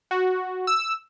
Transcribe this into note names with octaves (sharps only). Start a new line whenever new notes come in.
F#4
E6